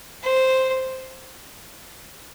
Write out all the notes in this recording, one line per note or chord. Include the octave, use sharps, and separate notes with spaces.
C5